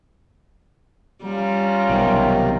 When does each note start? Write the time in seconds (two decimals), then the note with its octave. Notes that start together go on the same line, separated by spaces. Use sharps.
1.23 G3 C#4 F4 A#5
1.90 B1 C3 D#3